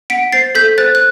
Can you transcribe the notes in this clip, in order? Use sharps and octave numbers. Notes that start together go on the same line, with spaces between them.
F#5 B6 D7
C5 A6 C7
A4 G6 B6
C5 F#6 A6
F#6